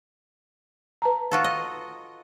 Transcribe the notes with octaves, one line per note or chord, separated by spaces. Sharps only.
B4 A5 A#5
F4 F#4 A4
D#5